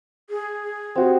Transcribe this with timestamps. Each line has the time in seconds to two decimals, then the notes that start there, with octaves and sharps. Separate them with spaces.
0.30 G#4
0.95 C4 F#4 G4